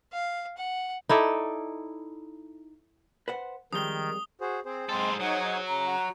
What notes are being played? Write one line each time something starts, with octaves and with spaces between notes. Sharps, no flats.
F5
F#5
D#4 E4 A4 D5
B4 C5 F#5
F2 D#3 G3 G#3 D#6 G7
F#4 G#4 C5
C4 G#4 C5
G#2 G#3 C4 A4 C6
F#3 D#4 C#5 F#5 D#6
C#3 A#5
F#4 F#5